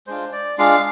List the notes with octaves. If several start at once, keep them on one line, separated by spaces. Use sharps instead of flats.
G#3 D4 F4 C5
D5
G#3 D4 F4 F5